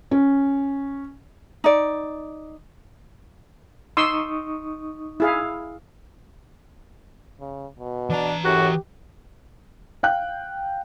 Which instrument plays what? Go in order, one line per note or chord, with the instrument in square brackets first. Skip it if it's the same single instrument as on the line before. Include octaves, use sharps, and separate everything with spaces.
[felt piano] C#4
[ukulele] D#4 D5
[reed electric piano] D#4 C#6 D#6 [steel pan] C6 E6
[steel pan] E4 G#4 F5
[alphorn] C#3
B2
[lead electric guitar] E3 A#5 [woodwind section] D4
[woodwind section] F#2 A2 [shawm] F#4 [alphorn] G4
[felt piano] F5 G5 F#6